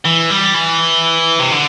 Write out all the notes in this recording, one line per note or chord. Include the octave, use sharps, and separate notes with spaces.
E3
G3
E3
C3
D3